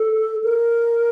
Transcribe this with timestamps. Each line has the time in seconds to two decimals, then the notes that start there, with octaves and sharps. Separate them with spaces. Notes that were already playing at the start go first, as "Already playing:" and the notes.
Already playing: A4
0.44 A#4